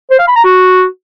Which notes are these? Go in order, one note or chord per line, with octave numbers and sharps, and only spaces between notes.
C5
F5
B5
A#5
F#4